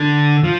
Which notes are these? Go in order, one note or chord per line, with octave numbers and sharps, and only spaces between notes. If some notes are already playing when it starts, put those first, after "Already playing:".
Already playing: D3
F3